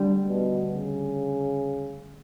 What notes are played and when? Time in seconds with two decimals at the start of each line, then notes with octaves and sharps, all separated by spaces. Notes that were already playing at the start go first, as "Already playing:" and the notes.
Already playing: D2 D3 G3
0.28 B2
0.72 C#3